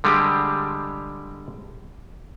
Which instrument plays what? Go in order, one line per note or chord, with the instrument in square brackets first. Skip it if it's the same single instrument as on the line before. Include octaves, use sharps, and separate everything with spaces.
[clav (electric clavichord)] D3 G3 G#3 G4